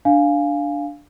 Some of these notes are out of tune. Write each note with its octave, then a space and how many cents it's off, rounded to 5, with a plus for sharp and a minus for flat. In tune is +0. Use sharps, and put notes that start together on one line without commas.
D4 +0 F5 +0 G#5 +0